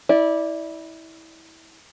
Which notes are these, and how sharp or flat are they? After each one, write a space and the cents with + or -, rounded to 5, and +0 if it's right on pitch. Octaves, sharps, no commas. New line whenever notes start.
E4 -25 D5 +0